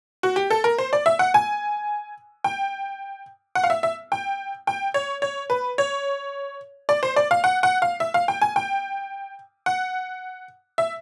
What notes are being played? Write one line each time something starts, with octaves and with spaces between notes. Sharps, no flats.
F#4
G4
A4
A#4
C5
D5
E5
F#5
G#5
G5
F#5
F5
E5
E5
G5
G5
C#5
C#5
B4
C#5
D5
C5
D5
F5
F#5
F#5
F5
E5
F5
G5
G#5
G5
F#5
E5